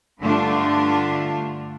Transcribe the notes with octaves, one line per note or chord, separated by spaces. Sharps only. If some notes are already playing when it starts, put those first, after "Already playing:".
G2 D3 A3 D4 F4